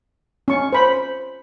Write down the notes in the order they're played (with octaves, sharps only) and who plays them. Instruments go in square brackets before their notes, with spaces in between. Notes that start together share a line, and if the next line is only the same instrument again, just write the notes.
[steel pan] C#4 C#6
C5 B5